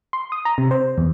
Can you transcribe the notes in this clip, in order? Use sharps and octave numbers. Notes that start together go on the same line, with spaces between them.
C6
D#6
A#5
C3
C5
E2